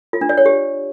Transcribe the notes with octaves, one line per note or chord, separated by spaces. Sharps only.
F4
D4
D5
C#5
G4